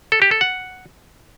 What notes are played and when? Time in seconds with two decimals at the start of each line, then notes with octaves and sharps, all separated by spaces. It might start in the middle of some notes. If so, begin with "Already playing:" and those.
0.12 A4
0.22 G4
0.31 A4
0.41 F#5